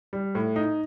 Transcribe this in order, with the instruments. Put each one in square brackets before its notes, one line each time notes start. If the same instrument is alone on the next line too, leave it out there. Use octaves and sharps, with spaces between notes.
[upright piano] G3
A2
D#4